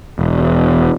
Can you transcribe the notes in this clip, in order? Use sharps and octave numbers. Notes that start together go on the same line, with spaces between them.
E1